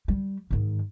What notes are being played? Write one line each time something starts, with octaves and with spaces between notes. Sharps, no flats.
G3
G#2 D#3